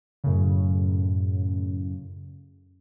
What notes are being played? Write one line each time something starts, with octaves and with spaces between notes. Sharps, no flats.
F#2 A2 C#3